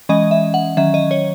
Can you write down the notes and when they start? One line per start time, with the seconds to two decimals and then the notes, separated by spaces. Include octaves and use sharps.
0.09 E3 G#3 C#4 D#5
0.31 E5
0.54 F#5
0.77 D#3 F#3 C#4 E5
0.94 D#5
1.11 C#5